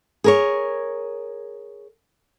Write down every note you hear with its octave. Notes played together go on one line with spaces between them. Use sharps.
G#4 A#4 C#5